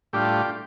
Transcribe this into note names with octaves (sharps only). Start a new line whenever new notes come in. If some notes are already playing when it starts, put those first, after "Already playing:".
A2 G3 D4 F4 G4